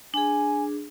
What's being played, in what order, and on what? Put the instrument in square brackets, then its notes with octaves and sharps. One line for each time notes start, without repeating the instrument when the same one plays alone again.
[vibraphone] D4 G#4 [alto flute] G#5